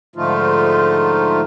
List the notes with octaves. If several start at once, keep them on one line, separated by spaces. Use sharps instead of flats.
G#2 D3 F3 A3 D#4 F4